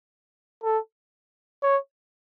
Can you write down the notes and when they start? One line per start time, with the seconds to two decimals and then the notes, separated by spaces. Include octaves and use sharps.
0.64 A4
1.63 C#5